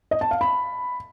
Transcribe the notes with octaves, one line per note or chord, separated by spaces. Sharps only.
D#5
A5
F5
B5